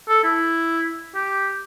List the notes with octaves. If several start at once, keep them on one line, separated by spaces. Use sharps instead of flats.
A4
E4
G4